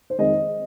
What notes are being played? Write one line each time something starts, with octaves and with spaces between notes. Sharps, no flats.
C5
F2 D#3 G#3 D#5